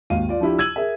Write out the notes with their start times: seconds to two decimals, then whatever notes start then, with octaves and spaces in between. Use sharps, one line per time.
0.10 G#1 D#2 F5 D#7
0.29 F4 D5
0.41 F3 D4 E4 G4
0.59 E6 G#6 D#7 F#7
0.76 G#4 A#4 E5